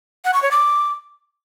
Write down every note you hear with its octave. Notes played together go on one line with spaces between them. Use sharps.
F#5
C#6
C#5
D6